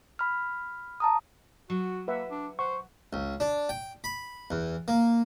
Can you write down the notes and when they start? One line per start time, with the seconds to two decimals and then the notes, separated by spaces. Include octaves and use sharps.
0.19 B5 F6
1.00 A5 A#5 D#6
1.70 F#3 F#4
2.08 A#3 B4 E5 F#5
2.31 D4
2.59 C5 F#5 C#6
3.13 C#2
3.40 D4
3.69 G5
4.04 B5
4.51 E2
4.88 A#3